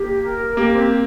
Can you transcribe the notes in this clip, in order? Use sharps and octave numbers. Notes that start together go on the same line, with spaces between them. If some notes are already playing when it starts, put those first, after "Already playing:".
Already playing: A#3 G4
A#4
A#3 G4
C4